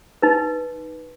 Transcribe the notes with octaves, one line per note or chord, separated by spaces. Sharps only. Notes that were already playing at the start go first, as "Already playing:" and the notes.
D#4 B4